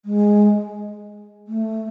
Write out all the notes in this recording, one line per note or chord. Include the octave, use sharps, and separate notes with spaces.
G#3
A3